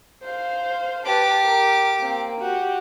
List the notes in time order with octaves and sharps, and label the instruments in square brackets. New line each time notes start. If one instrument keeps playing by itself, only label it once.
[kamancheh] C5 F5
[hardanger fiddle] G4 D6 [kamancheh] B4 A5
[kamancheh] A#4
A#3 C4
[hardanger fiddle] F#4 [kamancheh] G4